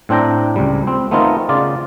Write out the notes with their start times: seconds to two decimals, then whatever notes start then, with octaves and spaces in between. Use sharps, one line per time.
0.09 A2 C4 D4 G5 A#5
0.56 C#2 G3
0.87 C4
1.11 A3 B3 C4 D#4 F4 A#4
1.49 C#3 F4 D5